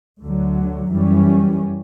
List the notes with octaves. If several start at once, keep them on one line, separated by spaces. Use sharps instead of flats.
D2 D3 F#3
F#2 E3 G3 C#4